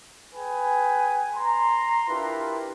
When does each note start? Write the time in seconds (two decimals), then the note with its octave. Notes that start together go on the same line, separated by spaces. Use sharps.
0.34 G#4 B4 G5 G#5
1.36 A#5 C6
2.09 D4 E4 F4 G4 A#4 B4